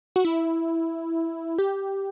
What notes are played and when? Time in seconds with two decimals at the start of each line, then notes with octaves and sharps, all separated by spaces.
0.16 F#4
0.25 E4
1.59 G4